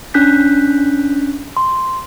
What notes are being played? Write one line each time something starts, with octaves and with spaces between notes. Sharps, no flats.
C#4 D4 F#6 G6 B6
C6